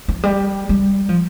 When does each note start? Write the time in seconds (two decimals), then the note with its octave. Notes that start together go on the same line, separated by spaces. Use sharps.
0.08 F3
0.23 G3
0.69 G3
1.09 F3